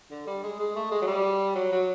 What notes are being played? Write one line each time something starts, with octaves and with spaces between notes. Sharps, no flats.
D3
G3
G#3
G#3
A3
G#3
F#3
G3
F#3
F#3